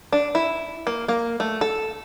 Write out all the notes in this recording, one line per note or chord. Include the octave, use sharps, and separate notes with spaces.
D4
E4
A#3
A#3
A3
A4